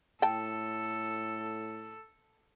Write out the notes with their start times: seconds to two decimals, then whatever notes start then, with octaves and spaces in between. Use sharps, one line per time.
0.22 A2 A4 G5 A5